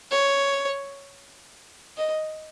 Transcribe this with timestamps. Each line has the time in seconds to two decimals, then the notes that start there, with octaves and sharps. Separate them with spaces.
0.11 C#5
1.97 D#5